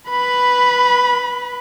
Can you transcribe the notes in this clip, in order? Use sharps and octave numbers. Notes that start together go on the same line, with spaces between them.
B4 B5